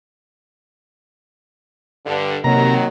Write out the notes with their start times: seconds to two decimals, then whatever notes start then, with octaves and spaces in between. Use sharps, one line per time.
2.05 G2 D3
2.44 C3 D#3 F#3 A#3 A#5